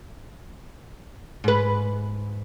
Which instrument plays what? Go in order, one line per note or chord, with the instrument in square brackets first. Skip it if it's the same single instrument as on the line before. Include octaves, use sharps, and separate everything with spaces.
[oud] G#2 B4